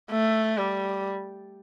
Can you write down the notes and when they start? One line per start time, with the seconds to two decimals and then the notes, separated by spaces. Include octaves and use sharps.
0.11 A3
0.57 G3